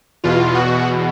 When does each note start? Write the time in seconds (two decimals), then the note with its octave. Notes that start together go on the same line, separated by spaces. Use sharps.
0.24 E2 B2 F4
0.55 F#4